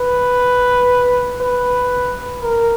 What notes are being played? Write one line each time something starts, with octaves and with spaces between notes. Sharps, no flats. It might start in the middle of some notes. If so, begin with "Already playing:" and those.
Already playing: B4
B4
A#4